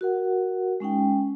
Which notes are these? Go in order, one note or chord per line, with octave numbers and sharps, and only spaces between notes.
F#4 A#4 F#5
G#3 C#4 D#4 G5